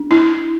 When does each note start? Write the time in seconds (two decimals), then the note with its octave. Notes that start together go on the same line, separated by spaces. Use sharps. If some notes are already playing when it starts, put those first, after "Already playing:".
Already playing: D4
0.11 E4